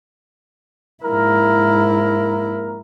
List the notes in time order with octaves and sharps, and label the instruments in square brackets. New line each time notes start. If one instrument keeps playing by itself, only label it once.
[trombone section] A#1 A#3 A#4 [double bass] G#2 E4